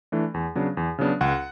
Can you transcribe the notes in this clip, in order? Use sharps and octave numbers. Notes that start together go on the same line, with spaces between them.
E3 A3 D4
E2
C#3 F#3 B3 D4
E2
C#3 F#3 B3 D4
C#2 F#5